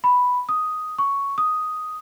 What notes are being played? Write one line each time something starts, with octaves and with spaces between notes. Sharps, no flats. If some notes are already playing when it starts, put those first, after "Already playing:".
B5
D#6
C#6
D#6